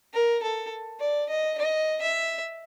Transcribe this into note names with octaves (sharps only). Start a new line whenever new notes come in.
A#4
A4
D5
D#5
D#5
E5